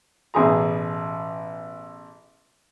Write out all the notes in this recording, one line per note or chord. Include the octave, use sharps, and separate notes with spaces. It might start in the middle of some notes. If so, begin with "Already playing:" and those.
A1 B2 G#4 A#5